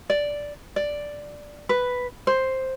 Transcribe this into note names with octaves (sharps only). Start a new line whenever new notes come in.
D5
D5
B4
C5